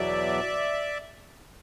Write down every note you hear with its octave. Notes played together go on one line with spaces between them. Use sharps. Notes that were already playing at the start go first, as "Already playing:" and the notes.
Already playing: E2 B2 F#3 D5 E5